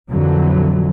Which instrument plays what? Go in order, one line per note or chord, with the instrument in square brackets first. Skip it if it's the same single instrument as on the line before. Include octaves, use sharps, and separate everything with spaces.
[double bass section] A#1 F2 D3 E3 F#3